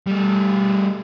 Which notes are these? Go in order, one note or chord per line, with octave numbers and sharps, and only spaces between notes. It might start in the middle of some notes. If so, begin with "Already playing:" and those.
G3 A3